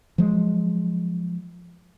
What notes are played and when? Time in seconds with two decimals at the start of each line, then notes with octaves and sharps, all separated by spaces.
0.18 F3 F#3 G#3